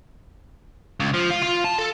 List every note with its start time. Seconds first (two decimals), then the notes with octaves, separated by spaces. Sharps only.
1.00 C#2
1.14 F3
1.30 F4
1.43 F4
1.64 A5
1.79 A4